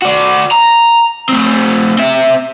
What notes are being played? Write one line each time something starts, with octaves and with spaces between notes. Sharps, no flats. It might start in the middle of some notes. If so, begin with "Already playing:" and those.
F#4 D5
A#5
A3 C4
C4 E5